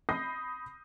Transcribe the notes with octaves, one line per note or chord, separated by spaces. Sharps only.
B5 D#6 G6 A#6 C7